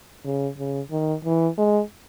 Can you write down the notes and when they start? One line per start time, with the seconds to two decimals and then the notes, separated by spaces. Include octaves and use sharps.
0.25 C#3
0.58 C#3
0.91 D#3
1.25 E3
1.58 G#3